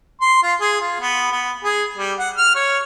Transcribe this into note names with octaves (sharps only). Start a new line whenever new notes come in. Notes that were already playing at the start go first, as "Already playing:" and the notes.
C6
F4
G#4
F4
B3
B3
G#4
G3
F#5
F6
C#5